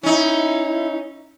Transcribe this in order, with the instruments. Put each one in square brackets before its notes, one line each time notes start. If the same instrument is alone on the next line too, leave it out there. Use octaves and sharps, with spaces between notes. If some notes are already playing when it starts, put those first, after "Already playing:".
[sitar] C#4 D#4 [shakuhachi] E4